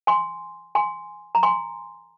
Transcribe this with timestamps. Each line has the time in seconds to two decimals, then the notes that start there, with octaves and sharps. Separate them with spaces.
0.07 G#5 C6
0.75 G#5 C6
1.35 A#5
1.43 G#5 C6